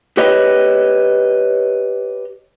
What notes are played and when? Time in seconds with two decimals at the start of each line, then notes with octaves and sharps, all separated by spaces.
0.17 G4 B4 C#5 D#5